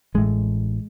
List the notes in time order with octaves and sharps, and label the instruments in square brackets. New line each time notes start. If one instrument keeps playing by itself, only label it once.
[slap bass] A1 A2 G#3